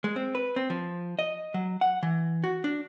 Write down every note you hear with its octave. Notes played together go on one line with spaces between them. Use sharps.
G#3
C4
B4
C4
F3
D#5
F#3
F#5
E3
F#4
D4